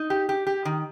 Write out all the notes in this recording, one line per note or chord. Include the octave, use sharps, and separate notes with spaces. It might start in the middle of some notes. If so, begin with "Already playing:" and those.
Already playing: D#4
G4
G4
G4
D#3